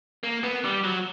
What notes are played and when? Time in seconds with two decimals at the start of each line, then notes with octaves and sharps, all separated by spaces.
0.23 A#3
0.44 B3
0.65 G3
0.84 F#3